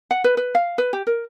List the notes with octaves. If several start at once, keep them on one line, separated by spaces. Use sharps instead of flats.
F#5
B4
B4
F5
B4
G4
A#4